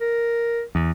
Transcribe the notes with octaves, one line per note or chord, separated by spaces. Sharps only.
A#4
E2